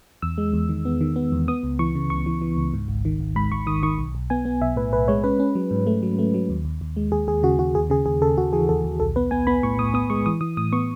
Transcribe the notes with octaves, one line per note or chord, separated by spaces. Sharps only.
E2 E6
G#3
E2
D#3
B3
D#3
B3
E2
B3 D#6
C#2
E3 C#6
C#3
C#2 C#6
E3
E3
C#2
G#2
G#1
D#3
G#1
G#2 B5
G#1 C#6
D#3 D#6
D#3 C#6
B1
B1
B3 G#5
B3
B1 E5
A2 B4
B1 B4
G#3 C#5
C#4 B4
C#4
F#3
G#2
A3
F#3
A3
F#3
D#2
D#2
D#2
G#3
D#2 G#4
D#2 G#4
C#3 F#4
D#2 F#4
D#2 G#4
C#3 G#4
D#2 G#4
C#3 A4
D#2 F#4
E3 G#4
D#2 A4
D#2
B1 A4
B3 B4
B3 G#5
B3 B5
A2 C#6
A2 D#6
B3 D#6
G#3 C#6
E3 D#6
E3 D#6
A2 D#6
B3 C#6